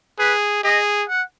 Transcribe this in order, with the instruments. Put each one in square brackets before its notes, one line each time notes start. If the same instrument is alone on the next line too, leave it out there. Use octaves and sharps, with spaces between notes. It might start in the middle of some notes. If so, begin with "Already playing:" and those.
[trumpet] G#4 [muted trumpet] B4
[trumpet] G#4 [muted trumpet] D#5
[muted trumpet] F#5